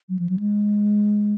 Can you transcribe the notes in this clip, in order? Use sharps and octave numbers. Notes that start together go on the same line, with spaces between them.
F#3
F3
F#3
G#3